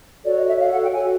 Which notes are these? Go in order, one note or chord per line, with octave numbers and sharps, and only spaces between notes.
F#4 A4 C#5 D5
D#5
E5
F#4 A4 C#5 F5
F#5
G5
F#4 A4 C#5 G#5